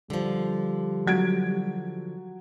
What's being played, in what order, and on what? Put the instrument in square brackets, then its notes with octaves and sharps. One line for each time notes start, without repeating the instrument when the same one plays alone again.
[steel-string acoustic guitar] D3 F3 [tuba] G3
[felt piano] F#3 G#6 D7